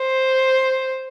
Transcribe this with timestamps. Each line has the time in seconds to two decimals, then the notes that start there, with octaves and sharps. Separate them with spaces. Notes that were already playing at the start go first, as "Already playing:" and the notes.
Already playing: C5